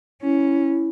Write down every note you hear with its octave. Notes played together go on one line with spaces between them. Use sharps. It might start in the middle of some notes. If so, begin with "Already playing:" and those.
C#4 E4